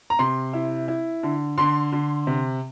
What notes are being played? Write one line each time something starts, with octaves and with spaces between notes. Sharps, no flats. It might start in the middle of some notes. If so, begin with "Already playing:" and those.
A#5
C3 C6
E4
E4
D3
D3 C6
D3
C3